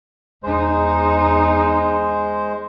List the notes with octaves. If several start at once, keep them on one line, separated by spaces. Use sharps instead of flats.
E2 G#3 D#4 C5